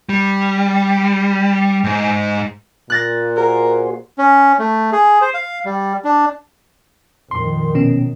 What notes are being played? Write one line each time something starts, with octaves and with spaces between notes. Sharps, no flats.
G3
G#2 D#4
A#2 F#6 A6 A#6
F#4 G#4 A#4 C5
C#4
A3
G#4
C5
F5
G3
D4
F2 A#2 D#3 C6
B2 B3 C#4